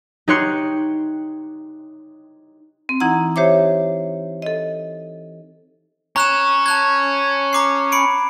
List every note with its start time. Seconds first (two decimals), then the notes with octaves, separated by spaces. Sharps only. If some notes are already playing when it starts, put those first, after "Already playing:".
0.28 D#4 G4 C#5 C6 F#6 C#7
2.89 C4
3.00 E3 D#4 E4 F#5 A#5
3.36 G4 C5 C#5 E5 D6
4.42 A4 D#5
6.16 C#4 C#5 A#5 F#6 E7
6.66 A5 F#6 G#6
7.53 A#5 D6 C7
7.92 B5 C#7 D7